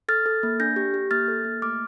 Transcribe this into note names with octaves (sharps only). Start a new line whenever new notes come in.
A4 F6 A6
A4
A#3
D4 G6 A#6
G4
G4
A#3 F6 A6
A4
A#3
A3 D6 F6